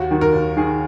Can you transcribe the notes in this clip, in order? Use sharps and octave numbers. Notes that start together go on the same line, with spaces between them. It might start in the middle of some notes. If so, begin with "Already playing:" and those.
Already playing: D#2 F#4
D#3
A#4
D#2
D#3 G#4